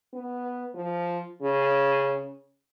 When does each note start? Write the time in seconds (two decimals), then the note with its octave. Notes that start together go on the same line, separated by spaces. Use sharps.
0.13 B3
0.74 F3
1.42 C#3